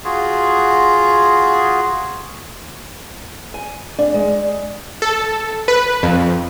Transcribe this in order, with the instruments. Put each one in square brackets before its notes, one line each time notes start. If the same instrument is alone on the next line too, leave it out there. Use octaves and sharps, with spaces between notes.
[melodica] F4 F#4 G#4
[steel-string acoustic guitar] G#5
D4
G#3
[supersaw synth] A4
B4
F2